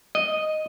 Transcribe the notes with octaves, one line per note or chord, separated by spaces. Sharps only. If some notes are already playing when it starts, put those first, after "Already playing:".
D#5